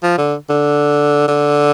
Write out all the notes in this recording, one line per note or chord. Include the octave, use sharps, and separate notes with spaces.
F3
D3
D3
D3